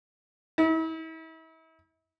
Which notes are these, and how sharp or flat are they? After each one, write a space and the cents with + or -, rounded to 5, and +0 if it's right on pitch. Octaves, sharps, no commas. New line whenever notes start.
E4 -40